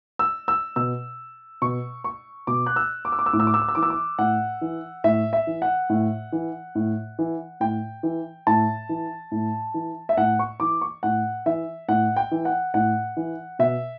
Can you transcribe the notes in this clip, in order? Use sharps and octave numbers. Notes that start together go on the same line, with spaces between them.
E6
E6
B2 E6
B2 C#6
C#6
B2 D6
F#6
E6
D6
E6
D6
E6
A2 D6
E6
D6
E6
D6
E6
E3 D6
E6
D6
A2 F#5
E3
A2 E5
E5
E3
F#5
A2
E3
A2
E3
A2 G5
E3
A2 A5
E3
A2
E3
E5
A2 F#5
C#6
E3 D6
C#6
A2 F#5
E3 E5
A2 F#5
G5
E3
F#5
A2 F#5
E3
B2 E5